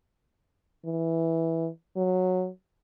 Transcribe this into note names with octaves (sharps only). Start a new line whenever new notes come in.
E3
F#3